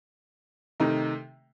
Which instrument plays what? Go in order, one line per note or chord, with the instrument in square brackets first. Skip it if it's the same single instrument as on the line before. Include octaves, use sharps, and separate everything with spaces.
[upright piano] C3 D#3 A3 D#4